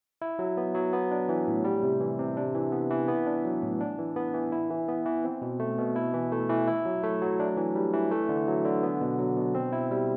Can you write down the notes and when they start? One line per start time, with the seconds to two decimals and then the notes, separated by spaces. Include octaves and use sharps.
0.22 E4
0.39 F#3
0.57 B3
0.75 F#3
0.93 B3
1.11 D4
1.29 E3
1.47 A2
1.64 G3
1.83 C3
2.01 E3
2.19 C3
2.37 D4
2.55 E3
2.72 B3
2.90 E3
3.08 B3
3.27 D4
3.44 F#3
3.62 A2
3.81 D4
3.98 E3
4.16 B3
4.34 E3
4.52 E4
4.70 E3
4.88 B3
5.06 E3
5.24 C4
5.42 B2
5.60 A3
5.78 B2
5.96 E4
6.14 E3
6.32 A3
6.50 E3
6.67 E4
6.85 F#3
7.04 A3
7.22 F#3
7.40 D4
7.57 E3
7.75 G3
7.93 E3
8.11 A3
8.29 D3
8.48 F#3
8.65 D3
8.83 B3
9.01 B2
9.19 F#3
9.37 B2
9.55 C4
9.73 E4
9.91 G3